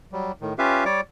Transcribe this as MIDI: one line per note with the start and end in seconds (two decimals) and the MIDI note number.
0.12 0.32 54
0.12 0.32 55
0.41 0.54 45
0.41 0.54 51
0.58 0.84 61
0.58 0.84 65
0.58 0.84 67
0.58 0.84 71
0.58 0.84 76
0.58 0.84 77
0.85 1.01 55
0.85 1.01 73
0.85 1.01 74
0.85 1.01 86